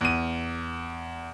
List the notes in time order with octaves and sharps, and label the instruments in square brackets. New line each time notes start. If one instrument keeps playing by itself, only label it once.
[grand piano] E2 D#7